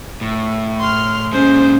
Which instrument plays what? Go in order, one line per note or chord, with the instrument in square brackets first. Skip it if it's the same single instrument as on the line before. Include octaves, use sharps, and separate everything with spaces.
[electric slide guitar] A2
[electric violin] C6 F6
[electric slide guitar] A#2 G#3 [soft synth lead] C#4 [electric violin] C5